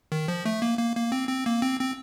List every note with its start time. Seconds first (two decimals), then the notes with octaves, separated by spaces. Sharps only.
0.12 D#3
0.28 F3
0.45 A3
0.62 A#3
0.79 A#3
0.96 A#3
1.12 C4
1.29 C4
1.46 A#3
1.62 C4
1.80 C4